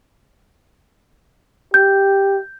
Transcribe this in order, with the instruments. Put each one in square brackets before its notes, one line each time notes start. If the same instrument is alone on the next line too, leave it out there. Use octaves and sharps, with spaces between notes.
[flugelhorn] G4 [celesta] G6